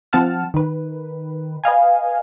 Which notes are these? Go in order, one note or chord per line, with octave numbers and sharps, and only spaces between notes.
F3 C4 F#5 A5 F6
D#3 B4
B4 D#5 F5 G#5